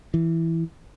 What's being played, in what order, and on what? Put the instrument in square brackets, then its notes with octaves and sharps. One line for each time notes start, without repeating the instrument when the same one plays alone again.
[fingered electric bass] E3